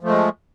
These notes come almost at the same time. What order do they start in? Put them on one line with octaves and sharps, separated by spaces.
F3 A3 G#3